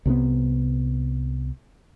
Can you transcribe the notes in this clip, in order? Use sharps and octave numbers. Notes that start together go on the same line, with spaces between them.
C2 C3 F#3 B3